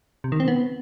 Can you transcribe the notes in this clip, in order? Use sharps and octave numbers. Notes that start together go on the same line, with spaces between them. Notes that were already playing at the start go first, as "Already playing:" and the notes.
C3
D#3
C4
B3